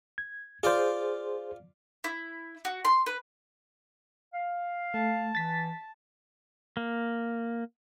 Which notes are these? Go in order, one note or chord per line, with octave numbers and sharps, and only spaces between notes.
G#6
F4 G#4 C5 D5
E4
F#4
C6
B4
F5
A3 A5
E3 A6 B6
A#3